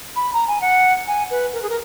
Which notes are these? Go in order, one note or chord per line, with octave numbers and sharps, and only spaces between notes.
B5
A#5
G#5
F#5
G#5
B4
A#4
G#4
A#4